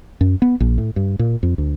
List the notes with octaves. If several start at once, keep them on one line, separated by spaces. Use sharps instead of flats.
F#2
B3
A#1
A2
G2
A#2
F2
D2